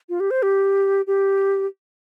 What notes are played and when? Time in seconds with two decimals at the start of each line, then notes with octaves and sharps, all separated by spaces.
0.09 F4
0.20 G4
0.31 C5
0.43 G4
1.07 G4